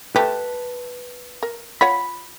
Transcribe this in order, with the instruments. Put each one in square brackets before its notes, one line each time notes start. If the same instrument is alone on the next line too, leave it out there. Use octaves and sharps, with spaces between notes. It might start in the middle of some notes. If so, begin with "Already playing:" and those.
[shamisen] A3 G4 [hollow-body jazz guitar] B4 A5
[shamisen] A#4
[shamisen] F4 C#5 F#5 [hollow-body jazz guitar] B5